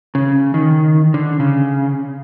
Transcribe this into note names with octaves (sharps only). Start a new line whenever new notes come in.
C#3
D#3
D3
C#3